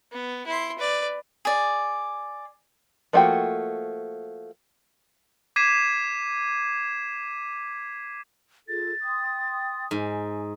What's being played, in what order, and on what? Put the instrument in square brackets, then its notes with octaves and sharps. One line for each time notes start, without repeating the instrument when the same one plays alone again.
[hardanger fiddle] B3
E4 C6
B4 D5
[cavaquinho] G#4 D5
[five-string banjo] F3 A3 A#3 F#4 G5
[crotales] D6 G#6 B6 C7 D#7 E7
[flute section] F4 G#4 A4 [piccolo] A6
[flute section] G5 C6 D#6
[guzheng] G#2 [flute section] G#5